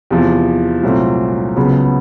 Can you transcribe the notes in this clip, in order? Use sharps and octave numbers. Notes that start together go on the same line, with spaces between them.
E2 C3 F3
C2 A#2 F#3 A3 C4
C#2 C#3 F#3 B3